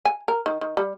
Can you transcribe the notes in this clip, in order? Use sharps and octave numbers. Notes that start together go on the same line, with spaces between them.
G#5
A#4
D#3
D#3
G3